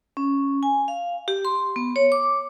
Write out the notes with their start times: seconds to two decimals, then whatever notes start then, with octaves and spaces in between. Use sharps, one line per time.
0.17 C#4
0.63 G#5
0.88 F5
1.28 G4
1.45 C6
1.76 B3
1.96 C#5
2.12 D6